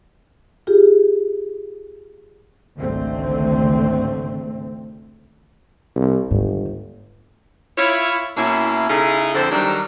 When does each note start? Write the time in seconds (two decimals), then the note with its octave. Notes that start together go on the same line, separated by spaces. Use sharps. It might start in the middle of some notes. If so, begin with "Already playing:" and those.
0.67 F4 G4 G#4
2.79 G#1 C#2 D3 A3 C4
5.95 C2
6.31 G1 G#2 D#3
7.77 E4 F4 C#5
8.37 B2 A#3 C#4 E4
8.90 C#3 D#4 E4 G#4 A4
9.35 F2 D3 C4 E4 A4 C5
9.51 D#3 F#3 G3 D4